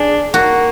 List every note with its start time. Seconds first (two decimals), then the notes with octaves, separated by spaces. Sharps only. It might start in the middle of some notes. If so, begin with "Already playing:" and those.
Already playing: D4 G#4
0.34 A#3 F#4